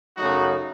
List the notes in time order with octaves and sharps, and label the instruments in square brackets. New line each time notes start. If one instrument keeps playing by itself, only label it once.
[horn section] F#2 C#3 F#3 A3 D#4 F#4